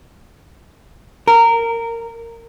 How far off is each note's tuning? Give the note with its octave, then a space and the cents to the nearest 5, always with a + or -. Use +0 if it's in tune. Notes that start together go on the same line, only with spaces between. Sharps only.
A#4 -15